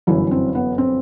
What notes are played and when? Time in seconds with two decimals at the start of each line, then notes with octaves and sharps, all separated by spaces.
0.07 G1 F#2 E3 E4
0.31 C4
0.55 B3
0.78 C4